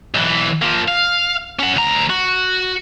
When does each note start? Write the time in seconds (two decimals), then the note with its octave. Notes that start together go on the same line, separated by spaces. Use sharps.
0.15 B1 E3
0.62 F3 A#3
0.88 F5
1.59 C#4 F#5
1.76 D2 A#5
2.10 F#4